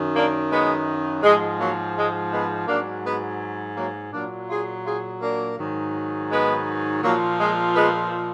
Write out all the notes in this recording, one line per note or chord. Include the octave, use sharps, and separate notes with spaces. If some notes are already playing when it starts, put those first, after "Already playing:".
Already playing: F#2 D#3 F#3
A#3 D4
G#3 B3
G#2 F3 G#3
F#3 A#3
G#3
G#3 B3
G#2 F#3 A#3 D4
G#3 B3
F#3 A#3
A#2 F#3 A#3 D4
F4 G#4
F4 G#4
A#3 D4
G#2 D#3 F#3
G#3 B3
A#2 F3 F#3 A#3
G#3
G#3 B3